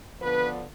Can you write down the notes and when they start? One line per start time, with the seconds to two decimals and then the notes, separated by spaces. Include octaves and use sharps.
0.20 D3 F3 B3 D4 B4